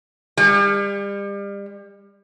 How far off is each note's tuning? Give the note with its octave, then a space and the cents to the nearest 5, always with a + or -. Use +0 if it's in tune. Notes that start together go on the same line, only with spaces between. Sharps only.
G3 +35